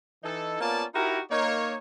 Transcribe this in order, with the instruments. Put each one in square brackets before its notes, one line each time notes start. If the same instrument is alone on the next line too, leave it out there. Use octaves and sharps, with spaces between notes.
[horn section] E3 D#4 A4
A#3 B3 C#4 F4 D5 A5
D#4 E4 F#4 G4 A#4
A#3 D#4 C#5